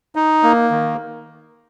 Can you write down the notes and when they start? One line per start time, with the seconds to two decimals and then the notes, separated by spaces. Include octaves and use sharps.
0.16 D#4
0.43 A#3
0.71 D#3